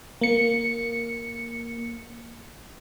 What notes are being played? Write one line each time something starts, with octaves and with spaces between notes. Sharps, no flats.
A#3 C#7